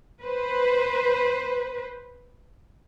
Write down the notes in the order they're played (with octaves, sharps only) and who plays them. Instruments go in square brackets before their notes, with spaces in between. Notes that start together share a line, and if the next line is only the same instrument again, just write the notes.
[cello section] B4 C5